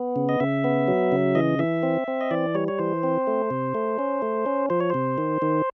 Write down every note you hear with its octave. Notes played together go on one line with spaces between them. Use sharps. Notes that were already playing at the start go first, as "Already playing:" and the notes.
Already playing: B3
C#3
D#5
C#3 E5
B3
F#3
C#3
E3 D#5
E3 E5
C4
C4
D#5
E3 D5
G3 C#5
C#5
E3 C5
C4
A3
C3
A3
C#4
A3
C#4
F3 C5
C#5
C3 C5
D#3
D#3